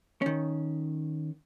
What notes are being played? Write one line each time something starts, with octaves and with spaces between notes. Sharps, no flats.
D#3 C#4